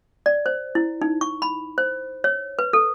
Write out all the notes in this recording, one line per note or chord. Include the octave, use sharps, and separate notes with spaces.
D5
C5
E4
D#4
C#6
B5
C5
C#5
B4
A4